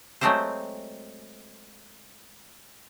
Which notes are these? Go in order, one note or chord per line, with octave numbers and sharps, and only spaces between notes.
F#3 G#3 A3 C4 G4 C5